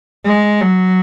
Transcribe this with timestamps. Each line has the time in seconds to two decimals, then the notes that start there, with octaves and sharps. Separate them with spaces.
0.25 G#3
0.62 F#3